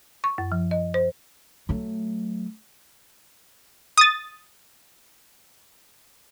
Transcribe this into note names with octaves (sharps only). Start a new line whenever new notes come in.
C#6
F#2
F3
D#5
C5
F#3 A3
D#6 A6